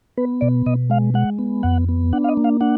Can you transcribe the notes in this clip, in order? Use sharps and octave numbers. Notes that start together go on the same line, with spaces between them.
B3 B4
B2 D5
B2 D#5
G#3 F5
G#3 F#5
B3
F2 F#5
B3
D4 F#5
F5
D#5
A#3
F5
D4 F#5